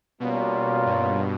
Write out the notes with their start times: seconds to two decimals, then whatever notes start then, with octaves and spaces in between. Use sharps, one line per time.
0.20 B2 G3 A#3 C#4 F4
0.85 G2